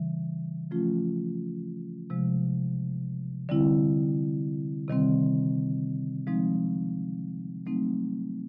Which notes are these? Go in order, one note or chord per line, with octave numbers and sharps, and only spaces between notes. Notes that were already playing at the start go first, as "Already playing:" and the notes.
Already playing: C#3 E3 G3
F3 A3 C#4 F4
C3 F3 G#3
D3 G3 C4 E4
C3 D#3 G3 C4
F3 G#3 C4 D#4
F#3 A3 C4 D#4